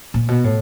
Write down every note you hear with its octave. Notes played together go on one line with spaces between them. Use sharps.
A#2
B2
A2